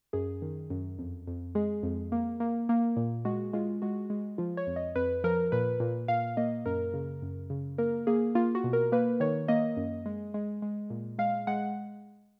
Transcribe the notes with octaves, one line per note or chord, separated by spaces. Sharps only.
F#2 G#4
D#3
F#2
F2
F2
G#3 G#4
F2
A#3
A#3
A#3
A#2
G#3 F#4
G#3 F4
G#3 F#4
G#3
F3 F4
C#5
F2
D#5
F2 B4
F3 A#4
A#2 B4
A#2
A#2 F5
A#3 D#5
F#2 A#4
C#3
F#2
C#3
A#3 A#4
A#3 G#4
A#3 F4
F#4
B2
A#4
A#3 B4
D#3 C#5
A#3 D#5
F#2
G#3
G#3
G#3
A#2
G#3 F5
G#3 F#5